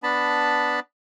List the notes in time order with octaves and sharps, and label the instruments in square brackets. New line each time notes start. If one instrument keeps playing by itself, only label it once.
[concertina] B3 D4 A5 B5